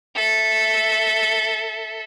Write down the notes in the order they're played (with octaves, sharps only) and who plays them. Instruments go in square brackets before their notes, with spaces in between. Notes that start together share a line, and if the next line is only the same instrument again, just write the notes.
[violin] A4 E5